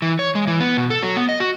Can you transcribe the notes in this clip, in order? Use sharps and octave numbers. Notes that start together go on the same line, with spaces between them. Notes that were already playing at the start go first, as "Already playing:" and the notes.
E3
C#5
G#3
E3
B3
B2
A4
F#3
B3
D#5
F#4